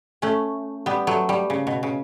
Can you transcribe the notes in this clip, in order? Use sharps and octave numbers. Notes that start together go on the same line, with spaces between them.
A3 C#4
G3 B3
F#3 A3
G3
C#3
B2
C#3